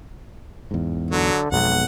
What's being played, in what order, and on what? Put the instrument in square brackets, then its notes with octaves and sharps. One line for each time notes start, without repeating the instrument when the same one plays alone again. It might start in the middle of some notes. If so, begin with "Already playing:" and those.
[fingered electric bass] E2 G#2
[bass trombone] D3 [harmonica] F#3
[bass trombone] B1 [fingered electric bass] F2 B2 G#3 [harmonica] F#5